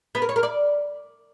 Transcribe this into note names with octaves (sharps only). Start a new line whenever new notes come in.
B3
A#4
C#5
A#4
D5